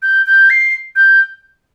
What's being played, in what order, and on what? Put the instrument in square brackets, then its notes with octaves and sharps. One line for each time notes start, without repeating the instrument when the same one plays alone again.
[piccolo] G6
G6
C7
G6